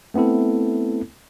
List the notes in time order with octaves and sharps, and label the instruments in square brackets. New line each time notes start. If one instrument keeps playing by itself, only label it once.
[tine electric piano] A3 B3 C4 E4 A4